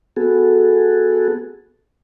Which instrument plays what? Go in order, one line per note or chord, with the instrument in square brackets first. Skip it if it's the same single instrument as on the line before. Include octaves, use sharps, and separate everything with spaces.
[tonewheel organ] B3 F#4 G#4 A4